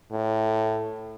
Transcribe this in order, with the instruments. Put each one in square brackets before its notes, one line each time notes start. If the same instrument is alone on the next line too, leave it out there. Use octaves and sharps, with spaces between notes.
[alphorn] A2